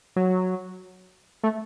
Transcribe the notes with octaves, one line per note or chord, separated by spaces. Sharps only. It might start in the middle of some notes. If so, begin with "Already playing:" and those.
F#3
A3